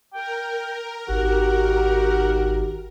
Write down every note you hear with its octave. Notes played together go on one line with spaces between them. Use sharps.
A#4 G5
G#1 D#3 F#4 G4 F#5